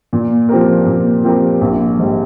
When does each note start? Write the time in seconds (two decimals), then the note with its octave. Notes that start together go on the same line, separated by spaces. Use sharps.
0.13 A#2
0.49 F3 C4 G4 A#4
0.86 A#2
1.24 F3 C4 G4 A#4
1.61 A#1
1.99 G#2 G3